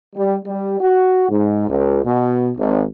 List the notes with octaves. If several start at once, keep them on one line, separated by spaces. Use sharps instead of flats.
G3
G3
F#4
G#2
C#2
B2
G#1